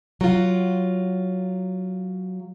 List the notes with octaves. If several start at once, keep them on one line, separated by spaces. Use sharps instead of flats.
F#3 F4